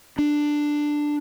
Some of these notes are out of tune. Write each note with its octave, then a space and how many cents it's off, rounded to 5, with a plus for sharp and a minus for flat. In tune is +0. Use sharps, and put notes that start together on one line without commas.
D4 +10